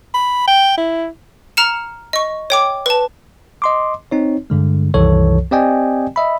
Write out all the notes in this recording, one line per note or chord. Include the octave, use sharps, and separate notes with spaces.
B5
G5
E4
A#5 F6 C#7 E7
D#5 C#6
C#5 G5 D6
B4 A5
D#5 C6 D6
C4 D#4 C#5
G2 D3 G#3
C2 F#2 D#3 E3 A4 C#5
C4 G4 D5 D#5 G5 G#5
D#5 E5 B5